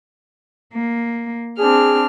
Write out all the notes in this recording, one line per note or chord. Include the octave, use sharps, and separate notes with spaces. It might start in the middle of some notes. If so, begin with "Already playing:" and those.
A#3
C4 D4 G#4 F6